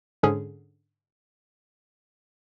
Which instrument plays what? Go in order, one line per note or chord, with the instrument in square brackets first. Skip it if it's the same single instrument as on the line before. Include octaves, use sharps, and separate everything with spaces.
[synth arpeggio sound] G#2 D3 C#4 G#4